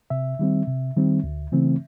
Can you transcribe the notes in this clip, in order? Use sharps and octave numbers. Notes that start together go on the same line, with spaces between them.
C3 E5
D#3 G3 C4
C3
D#3 G3 C4
D2
C#3 E3 A3 C4